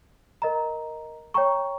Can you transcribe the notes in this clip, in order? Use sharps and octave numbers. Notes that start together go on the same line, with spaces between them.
A#4 D#5 A#5
C#5 G5 A#5 C#6